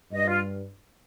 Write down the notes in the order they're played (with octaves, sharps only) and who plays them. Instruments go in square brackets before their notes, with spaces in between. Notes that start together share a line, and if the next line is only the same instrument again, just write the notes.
[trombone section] G2 [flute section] D#5
[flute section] F4